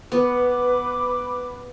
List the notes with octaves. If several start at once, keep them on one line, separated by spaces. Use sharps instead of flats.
B3 B4 B5 D6